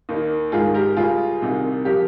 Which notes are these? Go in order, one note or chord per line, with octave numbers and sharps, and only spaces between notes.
D#2 D#3 A#3
G#2 D#3 G#3 F4 G#4
G4 A#4
C#2 C#3 G3 F4 G#4
C2 C3 D#3
C#3 F3 G4 A#4